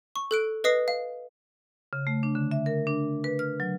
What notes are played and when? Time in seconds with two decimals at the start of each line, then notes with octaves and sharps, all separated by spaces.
0.16 C#6
0.31 A4 F#6 D7
0.64 B4 D#5 D#6 C7
0.88 F5
1.93 C#3
2.07 A3
2.23 D4
2.35 D3
2.51 E5
2.66 A#4
2.87 D4
3.24 B4
3.39 F6
3.60 F#3